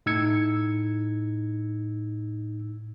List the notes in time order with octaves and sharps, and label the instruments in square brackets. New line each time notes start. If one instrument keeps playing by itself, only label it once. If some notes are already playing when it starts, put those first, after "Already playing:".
[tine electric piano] A2 D#4 E6 G#6 C#7